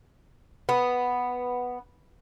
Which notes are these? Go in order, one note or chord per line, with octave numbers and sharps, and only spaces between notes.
B3